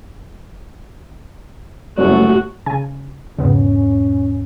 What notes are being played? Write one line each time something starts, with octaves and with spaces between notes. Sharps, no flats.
F#1 C2 F#2 A3 F#4
C#3 G#5
E1 G#2 C#3 B3 C#4